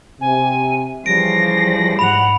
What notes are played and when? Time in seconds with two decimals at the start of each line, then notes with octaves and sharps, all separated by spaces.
0.21 C3 G#5
1.06 C#3 E3 F3 G3 A#6 D7
1.99 G#2 F#5 B5 F7